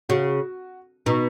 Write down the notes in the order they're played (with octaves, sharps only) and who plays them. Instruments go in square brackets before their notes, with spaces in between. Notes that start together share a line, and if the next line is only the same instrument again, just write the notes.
[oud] C#3 [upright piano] F#4
[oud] B2 [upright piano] D#4